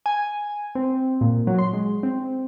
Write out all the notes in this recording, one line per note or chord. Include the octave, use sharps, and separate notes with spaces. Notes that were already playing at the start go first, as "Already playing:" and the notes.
G#5
C4
A#2
F#3
C6
G#3
C4